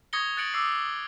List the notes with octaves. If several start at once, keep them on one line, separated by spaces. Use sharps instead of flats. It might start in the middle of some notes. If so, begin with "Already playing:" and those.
C#6 D#6 G#6 A#6 C#7 G7
F#6 A6 A#6 C#7 D7 F#7
D6 E6 C7